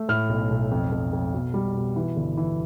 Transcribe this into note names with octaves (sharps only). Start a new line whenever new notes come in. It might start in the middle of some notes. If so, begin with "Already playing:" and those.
Already playing: A3
A2 F6
B1
B1
F2
F2
F2
B2
G3
B2
E3
G1
E3